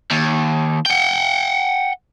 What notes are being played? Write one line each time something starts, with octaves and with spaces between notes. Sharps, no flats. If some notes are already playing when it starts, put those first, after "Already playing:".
D#2
F#5 G5